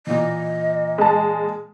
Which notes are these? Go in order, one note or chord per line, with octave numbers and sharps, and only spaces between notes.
A#2 E3 D#5
G#3 A5